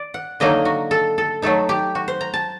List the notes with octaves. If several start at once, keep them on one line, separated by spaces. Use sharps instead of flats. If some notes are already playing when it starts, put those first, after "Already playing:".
Already playing: D5
F#5
D3 F#3 A#3 D#4 D#5
F#4
A4
A4
F#3 A3 D#4 A4
G4
F#4
C5
A#5
A5